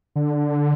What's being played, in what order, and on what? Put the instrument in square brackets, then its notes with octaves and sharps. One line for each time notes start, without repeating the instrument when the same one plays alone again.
[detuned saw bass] D3